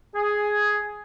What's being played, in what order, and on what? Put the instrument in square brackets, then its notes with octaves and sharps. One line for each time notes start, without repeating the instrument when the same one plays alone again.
[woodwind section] G#4